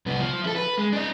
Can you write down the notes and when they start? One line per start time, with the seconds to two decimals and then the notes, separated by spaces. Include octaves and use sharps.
0.06 C2 B3
0.19 F3
0.44 E4 A4
0.56 B4
0.77 G#3
0.93 D4 D#5